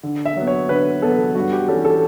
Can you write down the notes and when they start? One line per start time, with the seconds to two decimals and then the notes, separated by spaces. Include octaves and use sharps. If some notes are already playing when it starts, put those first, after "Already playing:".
0.03 D3
0.25 E5
0.37 F#3 B3
0.47 C#5
0.69 D3 B4
1.02 F#3 B3 A4
1.35 G2 F#4
1.52 G4
1.68 E3 G3 C#4 A4
1.85 A4